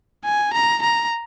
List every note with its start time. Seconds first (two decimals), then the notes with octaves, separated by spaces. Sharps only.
0.25 G#5
0.53 A#5
0.82 A#5